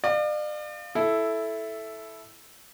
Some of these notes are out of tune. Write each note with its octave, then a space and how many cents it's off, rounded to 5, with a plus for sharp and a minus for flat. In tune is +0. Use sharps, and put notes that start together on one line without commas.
D5 +40 F5 +0
E4 +0 A4 -10